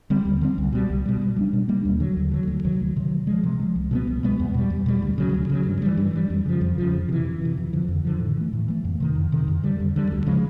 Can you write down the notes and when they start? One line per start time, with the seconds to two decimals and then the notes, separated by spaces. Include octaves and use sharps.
0.10 D3 G3 C4
0.25 D#2
0.41 D3 G3 C4
0.58 C2
0.73 B2 G3
0.90 C2
1.06 B2 G3
1.21 B2
1.36 G3 A#3 D4
1.53 B2
1.68 G3 A#3 D4
1.85 D#2
2.00 D3 F#3
2.17 D#2
2.32 D3 F#3
2.47 D2
2.65 C3 D#3 F#3
2.80 D2
2.96 C3 D#3 F#3
3.12 C3
3.27 F3 G#3
3.43 C3
3.59 F3 G#3
3.76 C2
3.91 B2 G#3 B3
4.07 C2
4.23 B2 G#3 B3
4.39 E2
4.54 B2 G3
4.70 E2
4.86 B2 G3
5.02 D2
5.18 C#3 F#3
5.34 D2
5.50 C#3 F#3
5.67 G2
5.82 E3 G3
5.97 G2
6.13 E3 G3
6.30 F2
6.46 C#3 F3
6.61 F2
6.78 C#3 F3
6.93 F2
7.09 C3 E3
7.25 F2
7.42 C3 E3
7.57 F2
7.73 D3 F3
7.88 F2
8.05 D3 F3
8.20 A2
8.37 E3 A3
8.53 A2
8.68 E3 A3
8.84 F2
9.00 C3 D#3
9.15 F2
9.32 C3 D#3
9.48 F2
9.63 D3 G3
9.80 F2
9.96 D3 G3
10.12 D2
10.27 C#3 F3 G#3